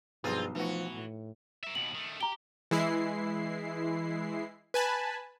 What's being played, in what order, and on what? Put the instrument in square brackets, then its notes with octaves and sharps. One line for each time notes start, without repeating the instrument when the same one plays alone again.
[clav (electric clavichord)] B1 [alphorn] G2 [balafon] F3 G4 B4 [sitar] C4 F4 G#4
[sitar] E3 F#4 [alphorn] F3 [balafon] A3 D#4 B4
[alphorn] A2
[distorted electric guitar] A#4 E5
[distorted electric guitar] D#2 B2 [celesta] F#7
[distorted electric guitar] D#3 A3
[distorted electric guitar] G4 [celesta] A#5 G7
[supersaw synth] E3 G#3 E4 C7
B4 G#5 A5 B5